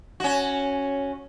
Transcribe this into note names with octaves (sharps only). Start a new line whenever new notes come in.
C#4 F#4